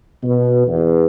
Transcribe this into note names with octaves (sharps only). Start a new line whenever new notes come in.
B2
E2